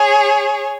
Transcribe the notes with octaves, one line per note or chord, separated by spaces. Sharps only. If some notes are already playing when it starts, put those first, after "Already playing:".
Already playing: G#4 C#5